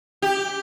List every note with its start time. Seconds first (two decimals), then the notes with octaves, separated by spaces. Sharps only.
0.22 G4